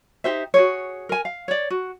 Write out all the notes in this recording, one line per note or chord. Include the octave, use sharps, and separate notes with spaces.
D#4 G4 C5 E5
F#4 G#4 C#5
A#4 G#5
F5
C#5 D5
F#4